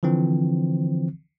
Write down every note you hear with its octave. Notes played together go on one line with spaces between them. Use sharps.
D3 E3 F3 C4